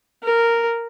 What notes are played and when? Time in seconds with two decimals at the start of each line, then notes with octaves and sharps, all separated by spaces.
0.23 A#4